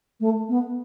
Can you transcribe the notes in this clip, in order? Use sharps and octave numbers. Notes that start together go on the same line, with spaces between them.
A3
B3